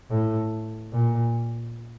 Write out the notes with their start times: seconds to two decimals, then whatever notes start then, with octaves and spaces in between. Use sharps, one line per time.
0.10 A2
0.93 A#2